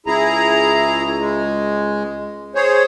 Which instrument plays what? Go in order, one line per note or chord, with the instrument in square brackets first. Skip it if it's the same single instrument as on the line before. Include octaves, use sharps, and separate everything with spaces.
[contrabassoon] C#2 [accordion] E4 G#4 A#5
[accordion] G#3
G#4 C5 C#5